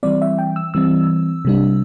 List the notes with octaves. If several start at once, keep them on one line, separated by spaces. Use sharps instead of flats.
E3 G3 C4 D5
E5
G5
E6
E3 G3 C4 E6
C3 G3 D4